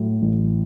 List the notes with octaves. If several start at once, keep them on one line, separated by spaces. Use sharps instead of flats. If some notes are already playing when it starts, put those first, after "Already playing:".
Already playing: A2 F#3
A1